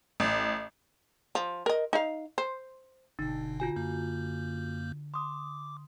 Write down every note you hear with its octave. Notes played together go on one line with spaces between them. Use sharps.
A1
F3
A#4 D#5
D#4 F5
C5
G1 B2 D3 D#4
F4 F#4 G#5
F#2 A#3 G6
C6 D6 D#6